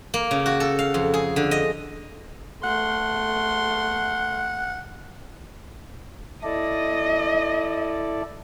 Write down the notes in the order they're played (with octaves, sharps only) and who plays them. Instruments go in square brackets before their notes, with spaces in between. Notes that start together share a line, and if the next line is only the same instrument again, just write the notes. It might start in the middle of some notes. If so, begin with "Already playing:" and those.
[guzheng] A#3
C#3
F#4
A4
F5
F2
G#4
D3
D#5
[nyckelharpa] A3 C6 [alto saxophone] F#5
[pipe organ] E4 A4 D5 [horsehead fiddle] D#5